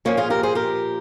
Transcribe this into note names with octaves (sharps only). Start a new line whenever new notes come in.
A#2 F3 A#3 C#4
F4 G#4
G4 A#4
G#4 C5
G4 A#4